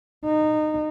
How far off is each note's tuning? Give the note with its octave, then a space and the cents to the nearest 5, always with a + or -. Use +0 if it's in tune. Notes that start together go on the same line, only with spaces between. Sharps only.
D#4 -20